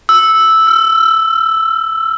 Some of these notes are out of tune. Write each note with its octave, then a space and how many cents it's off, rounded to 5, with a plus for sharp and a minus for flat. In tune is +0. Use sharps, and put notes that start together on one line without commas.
E6 -5
E6 +45